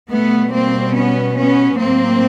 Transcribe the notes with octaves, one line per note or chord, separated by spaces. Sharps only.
B2 G3 A3 B3
A#3 C4
B3 C#4
B3 C#4
A2 F#3 A#3 C4